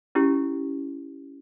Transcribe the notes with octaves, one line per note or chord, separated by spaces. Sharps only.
C#4 E4 G4